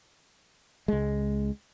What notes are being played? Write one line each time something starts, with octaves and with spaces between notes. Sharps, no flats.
C#2 G#3